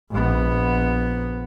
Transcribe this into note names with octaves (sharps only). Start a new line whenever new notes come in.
A#1 B3